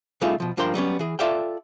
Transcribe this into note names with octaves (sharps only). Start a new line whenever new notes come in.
C#3 G3 A3 D#4 F4 G#4
B2 F3
G2 F3 D4 A#4 G5 C6
F#3 G3 B3 C#4
E3 G#4
F4 A4 D5 E5 F5 G5